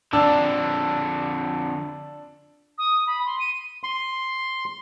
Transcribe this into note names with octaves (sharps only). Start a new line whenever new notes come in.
F2 D3 D4 A5 E6
D#6
B5
C6
D#7
C6